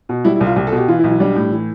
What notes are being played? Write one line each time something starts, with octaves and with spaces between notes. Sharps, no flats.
B2
G3 E4
E4
C2
F4
C2 G4
A4
B2
G4
E3 F4
E4
B1
E4
G3 D4
A2
E3